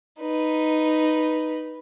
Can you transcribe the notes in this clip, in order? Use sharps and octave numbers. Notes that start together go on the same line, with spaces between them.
D#4 B4